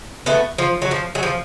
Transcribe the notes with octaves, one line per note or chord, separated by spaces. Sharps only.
A3 B3
F3
F#3
F3
F#3
F3